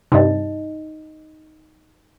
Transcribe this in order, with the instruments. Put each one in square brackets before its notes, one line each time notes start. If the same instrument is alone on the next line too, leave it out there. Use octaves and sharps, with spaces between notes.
[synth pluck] G2 C3 [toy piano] D#4 D#5